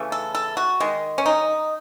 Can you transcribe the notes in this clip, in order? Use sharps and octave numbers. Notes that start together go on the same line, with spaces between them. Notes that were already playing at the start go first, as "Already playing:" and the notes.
Already playing: C#3 E3 A3
A4
A4
F#4
D#3 G#3
C#4
D#4